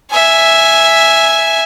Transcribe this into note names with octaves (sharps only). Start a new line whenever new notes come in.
E5 G#5